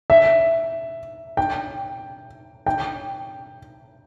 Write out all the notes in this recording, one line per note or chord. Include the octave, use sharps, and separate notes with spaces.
E5
G5
G5